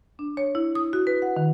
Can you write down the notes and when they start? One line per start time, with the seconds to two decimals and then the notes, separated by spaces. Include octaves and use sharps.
0.19 D4
0.37 C#5
0.55 E4
0.75 D#6
0.93 F#4
1.07 B4
1.22 F#5
1.37 D#3